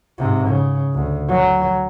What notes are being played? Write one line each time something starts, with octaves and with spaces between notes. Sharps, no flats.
G#2 C3
C#3
D2
F#3